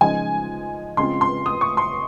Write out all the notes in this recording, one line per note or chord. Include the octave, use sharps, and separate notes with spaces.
C#3 F3 G#3 D#4 G#5
C#3 G#3 C4 F4 C6
C6
D#6
C#6
C6